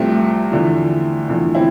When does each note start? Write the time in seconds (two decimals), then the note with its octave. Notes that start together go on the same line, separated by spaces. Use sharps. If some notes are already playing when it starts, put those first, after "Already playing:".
Already playing: C2 C3 F3 A3 C4
0.52 E2 D3 F3
1.28 E2 D3 F3
1.55 C4 E4